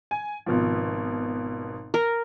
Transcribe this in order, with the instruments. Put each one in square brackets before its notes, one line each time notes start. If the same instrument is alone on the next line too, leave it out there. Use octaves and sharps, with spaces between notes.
[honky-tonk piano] G#5
G#1 B2 F3
[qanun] A#4